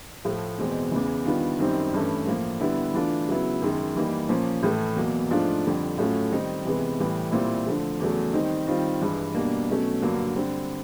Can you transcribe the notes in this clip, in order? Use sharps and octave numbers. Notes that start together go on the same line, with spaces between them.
A2 F3 A3
E2 B2 G#3 C4
E2 C#3 E3
D#3 G3 B3 D4 F4
F#2 D#3 G3 C4 D#4
G2 E3 A3 C#4
A2 F3 A#3
D3 G3 B3 E4
E3 A3 D4 F4
C#3 F#3 B3 E4
F#2 D#3 G#3
E3 G3 A#3 D#4
A#2 F3 A#3 C#4
A2 E3 A3
E2 B2 F#3 A#3
G#2 F3 A3 D4 F4
F2 D3 G3
A2 F#3 A3 C#4 F4
D#3 G3 C4 D#4
C3 E3 G#3 B3
A2 E3 G3
A#2 G3 C4 E4
D3 F3 A3
E2 C#3 F#3 A3
D#3 G3 C4 D#4
D#3 G3 C4 F4
G2 E3 G#3
B2 G3 A#3 D4
B2 F#3 A3 C#4
G2 D3 F#3 A#3
D3 G3 C4